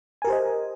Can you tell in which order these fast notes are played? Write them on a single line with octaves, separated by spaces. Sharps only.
G#5 A#4 G4 C5 D#5